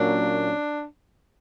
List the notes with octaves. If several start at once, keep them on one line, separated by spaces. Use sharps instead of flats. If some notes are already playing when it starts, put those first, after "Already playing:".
Already playing: A#2 F#3 A#3 C#4 D4